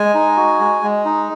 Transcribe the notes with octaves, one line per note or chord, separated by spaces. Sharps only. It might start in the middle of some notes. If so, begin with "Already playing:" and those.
Already playing: G#3 G#5
D#4
F#4
G#3
G#3
D#4